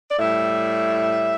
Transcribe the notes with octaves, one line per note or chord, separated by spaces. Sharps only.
D5
A2 G3 E5